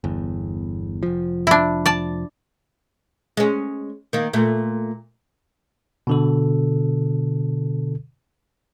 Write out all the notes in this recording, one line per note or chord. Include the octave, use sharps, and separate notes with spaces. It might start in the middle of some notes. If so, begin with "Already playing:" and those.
G1 E2
F1 F3
D4 E4
D5 A5
G#3 C#4
D#3 A#3
A#2 A3
B2 D3 A4